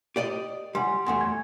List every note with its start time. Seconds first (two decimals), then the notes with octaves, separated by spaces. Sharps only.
0.16 G4 D5 D#5
0.75 G3 F#5 G#5 C6
1.06 E2 A2 A3 F#5 G#5 C6
1.21 G#5 G#6